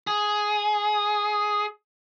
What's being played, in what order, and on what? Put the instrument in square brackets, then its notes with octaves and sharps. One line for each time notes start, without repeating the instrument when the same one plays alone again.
[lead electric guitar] G#4